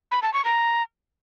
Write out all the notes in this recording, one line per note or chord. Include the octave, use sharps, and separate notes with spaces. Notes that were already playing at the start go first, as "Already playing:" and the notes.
B5
A5
C#6
A#5